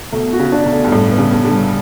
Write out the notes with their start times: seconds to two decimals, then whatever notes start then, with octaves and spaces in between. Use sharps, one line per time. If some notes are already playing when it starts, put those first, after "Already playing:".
0.12 B2 A3
0.33 F#4
0.39 C#3
0.52 D4
0.66 B2
0.72 A3
0.84 G2
0.92 A2 G3
1.12 B3
1.18 C#3
1.32 B3
1.44 D3
1.51 G3